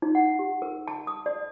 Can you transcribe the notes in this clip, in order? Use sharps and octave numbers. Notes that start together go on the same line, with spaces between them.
D#4
F#5
G4
A#4
A5
D#6
D5